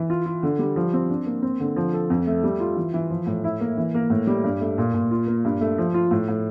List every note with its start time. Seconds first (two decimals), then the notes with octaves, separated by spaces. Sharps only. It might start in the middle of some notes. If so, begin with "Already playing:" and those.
Already playing: E3
0.10 F4
0.26 F4
0.43 D3
0.59 G3
0.76 F3
0.93 C4
1.09 D4
1.26 A#3
1.42 C4
1.60 D3
1.76 F3
1.94 A4
2.10 F2
2.27 A3
2.43 G3
2.60 F4
2.76 E3
2.94 E3
3.10 F3
3.27 A2
3.44 E4
3.60 A#3
3.77 E3
3.94 A#3
4.10 A2
4.27 G3
4.44 G2
4.61 A3
4.78 A#2
4.94 A#2
5.11 F4
5.27 A#3
5.45 G2
5.60 A3
5.78 F3
5.94 F4
6.11 A2
6.28 A2